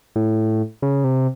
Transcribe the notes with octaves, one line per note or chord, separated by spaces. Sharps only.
A2
C#3
C3